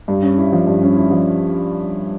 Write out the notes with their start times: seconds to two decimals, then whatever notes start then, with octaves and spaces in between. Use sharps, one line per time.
0.08 G2
0.23 C#4
0.38 E4
0.52 F3
0.67 G2
0.82 C#4
0.96 E4
1.11 F3